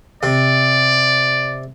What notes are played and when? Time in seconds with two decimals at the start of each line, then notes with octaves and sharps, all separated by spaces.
0.23 C3 D5